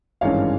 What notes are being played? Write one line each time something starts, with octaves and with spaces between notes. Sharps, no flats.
G#1 G2 E3 G#3 C#4 C#5 F5